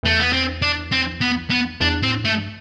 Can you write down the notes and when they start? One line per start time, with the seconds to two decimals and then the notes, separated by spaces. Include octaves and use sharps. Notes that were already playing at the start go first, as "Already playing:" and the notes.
0.03 E2 A3
0.19 B3
0.33 C4
0.62 D4
0.92 C4
1.21 B3
1.50 B3
1.81 E2 D4
2.02 A2 C4
2.25 G2 A3